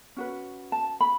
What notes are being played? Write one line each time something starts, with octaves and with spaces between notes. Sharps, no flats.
C#4 F#4 B4
A5
B5